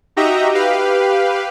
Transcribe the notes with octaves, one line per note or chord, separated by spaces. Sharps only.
D#4 F#4 G4 D#5 E5 A#5
G4 B4 F5